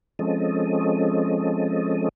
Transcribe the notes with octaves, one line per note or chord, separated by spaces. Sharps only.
F3 G#3 C4 C#4 A4 D#5